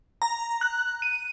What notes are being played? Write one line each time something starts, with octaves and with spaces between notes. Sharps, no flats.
A#5
F#6
D#7